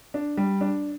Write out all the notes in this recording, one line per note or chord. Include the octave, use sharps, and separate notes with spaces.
D4
G3
D4